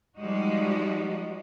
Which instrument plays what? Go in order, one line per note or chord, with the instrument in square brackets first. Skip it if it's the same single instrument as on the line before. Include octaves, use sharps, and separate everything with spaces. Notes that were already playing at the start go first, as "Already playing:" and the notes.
[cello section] F3 G3 G#3 D#4 F#4